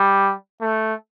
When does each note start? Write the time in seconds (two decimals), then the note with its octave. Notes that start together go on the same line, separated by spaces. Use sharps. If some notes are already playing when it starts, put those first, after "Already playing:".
Already playing: G3
0.61 A3